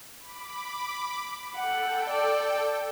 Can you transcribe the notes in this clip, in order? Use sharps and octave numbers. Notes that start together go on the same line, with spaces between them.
B5 D6
A4 F#5 G5
D5